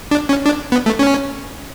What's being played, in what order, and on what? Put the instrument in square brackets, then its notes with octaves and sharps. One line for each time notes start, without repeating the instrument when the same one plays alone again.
[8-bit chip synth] D4
C#4
D4
B3
A3
C#4